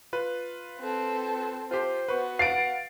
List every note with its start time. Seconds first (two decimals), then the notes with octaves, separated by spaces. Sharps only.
0.13 F4 B4
0.79 C4 A4
1.71 F4 G4 C5
2.08 B3 F#4 B4 C#6
2.39 F5 F#5 A6 C7 D7